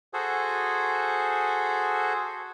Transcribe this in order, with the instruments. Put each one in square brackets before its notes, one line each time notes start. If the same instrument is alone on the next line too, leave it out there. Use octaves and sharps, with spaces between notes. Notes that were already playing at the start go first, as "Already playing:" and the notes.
[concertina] F#4 G#4 A4 C5